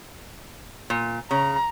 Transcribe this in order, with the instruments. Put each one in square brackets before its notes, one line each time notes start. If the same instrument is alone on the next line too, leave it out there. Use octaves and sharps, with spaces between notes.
[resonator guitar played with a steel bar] A#2
[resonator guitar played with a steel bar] C#3 [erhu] A#5